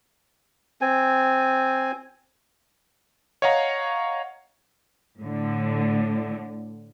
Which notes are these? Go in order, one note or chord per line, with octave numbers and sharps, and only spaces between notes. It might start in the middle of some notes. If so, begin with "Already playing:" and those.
C4 G#5
C#5 D#5 F5 F#5 A#5 C#6
A2 D3